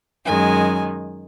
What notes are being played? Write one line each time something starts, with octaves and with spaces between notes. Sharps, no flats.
F#2 D#3 G#3 G#5